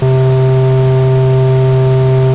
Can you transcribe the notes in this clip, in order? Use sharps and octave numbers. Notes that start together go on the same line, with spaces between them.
C3